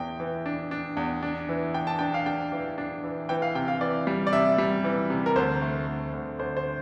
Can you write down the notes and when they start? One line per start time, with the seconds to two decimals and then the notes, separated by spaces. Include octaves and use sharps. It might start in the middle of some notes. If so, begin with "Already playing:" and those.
Already playing: E2 E3 G5
0.20 E3
0.46 D4
0.71 D4
0.97 E2
1.23 D4
1.49 E3
1.74 D4 G5
1.87 A5
1.99 D4 G5
2.14 F5
2.26 D4 G5
2.52 E3
2.78 D4
3.04 E3
3.29 E3 G5
3.42 F5
3.55 C3 G5
3.68 F5
3.81 E3 D5
4.07 G3
4.27 D5
4.33 C3 E5
4.58 G3
4.84 E3
5.10 C3
5.26 A#4
5.36 D2 C5
5.62 A3
5.88 D2
6.13 D2
6.39 D2 C5
6.57 C5